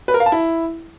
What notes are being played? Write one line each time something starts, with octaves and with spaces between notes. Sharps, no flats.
B4
A#4
F5
A5
E4